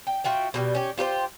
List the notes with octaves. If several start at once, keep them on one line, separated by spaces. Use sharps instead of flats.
G5
F4 F#4 E5 G5
B2 D#3 G3
C#4 G4
F4 G4 A#4 C5